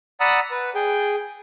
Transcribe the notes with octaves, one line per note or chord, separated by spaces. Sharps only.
D5 F#5 A#5 B5 D#6 E6
B4
G#4 G5